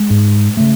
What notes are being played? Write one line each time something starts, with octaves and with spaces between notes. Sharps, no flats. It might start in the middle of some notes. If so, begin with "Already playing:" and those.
Already playing: G#3
G#2
C#3 A3